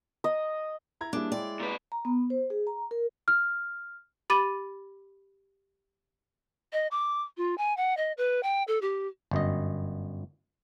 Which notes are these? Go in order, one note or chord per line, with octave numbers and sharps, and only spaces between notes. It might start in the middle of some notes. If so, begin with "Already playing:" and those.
D#5
E4 A#5 G#6
G3 A#3 D4 E4 G#4 D6
G#3 E4 D5 G5
A#2 B4
A#5
B3
C5
G#4
A#5
A#4
F6
G4 B5 D6 A6 D#7
D#5
D6
F4
G#5
F#5
D#5
B4
G5
A4
G4
G1 F#2 D#5